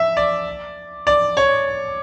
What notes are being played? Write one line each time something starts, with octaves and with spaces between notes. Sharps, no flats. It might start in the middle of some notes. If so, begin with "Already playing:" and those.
Already playing: E5
D5
D5
C#5